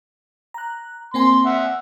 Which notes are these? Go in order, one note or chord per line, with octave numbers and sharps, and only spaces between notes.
A#5 F#6
A#3 C4 G#5 C6
E5 F#5